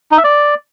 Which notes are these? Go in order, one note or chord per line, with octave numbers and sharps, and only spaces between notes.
D#4
E5
D5